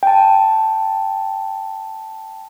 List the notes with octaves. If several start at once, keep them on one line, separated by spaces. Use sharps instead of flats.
G5 A5